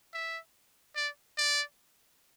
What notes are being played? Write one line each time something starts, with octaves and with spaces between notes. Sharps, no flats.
E5
D5
D5